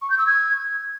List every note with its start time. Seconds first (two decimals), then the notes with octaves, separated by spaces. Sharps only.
0.02 C#6
0.10 G6
0.18 E6
0.27 G#6